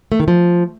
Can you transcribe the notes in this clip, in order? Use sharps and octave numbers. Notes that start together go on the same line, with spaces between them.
A3
D#3
F3